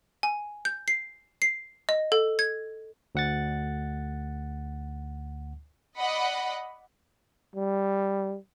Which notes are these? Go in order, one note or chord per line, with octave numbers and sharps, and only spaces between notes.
G#5
G6
C7
C7
D#5
A4
G#6
D2 F#5 A6
D5 D#5 F#5 B5
G3